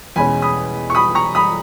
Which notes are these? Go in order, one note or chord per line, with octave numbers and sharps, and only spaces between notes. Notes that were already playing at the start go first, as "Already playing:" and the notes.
E2 B2 G#3 C#4 G#5 B5
B5 D#6
C#6
B5 D#6
A#5 C#6
B5 D#6